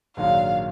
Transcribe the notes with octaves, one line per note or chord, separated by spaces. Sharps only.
A#1 G#2 D#3 F#3 D4 F5